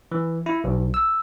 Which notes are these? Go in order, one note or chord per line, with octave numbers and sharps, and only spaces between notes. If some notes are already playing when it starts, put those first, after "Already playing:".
E3
E4
B1
E6